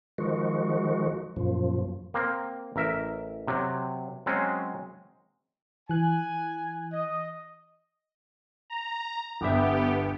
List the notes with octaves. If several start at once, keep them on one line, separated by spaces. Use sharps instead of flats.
D#3 F3 G#3 F#4
F#2 A#2 F3
A#3 C4
A1 A#4 E5
C3 F#3
F#3 G#3 C4 C#4
E3 G#5 F#6
D#5
A#5
G1 B3 G4 E5